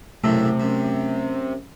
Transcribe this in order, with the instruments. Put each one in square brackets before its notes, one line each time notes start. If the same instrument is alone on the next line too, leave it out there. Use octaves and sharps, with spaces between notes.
[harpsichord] B1 F#2 A2 [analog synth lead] C3 [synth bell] A3
[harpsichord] F#2